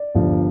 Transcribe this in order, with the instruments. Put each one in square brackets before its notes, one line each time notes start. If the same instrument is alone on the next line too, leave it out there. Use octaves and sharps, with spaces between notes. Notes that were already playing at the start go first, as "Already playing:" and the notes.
Already playing: [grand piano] D5
G1 G2 F3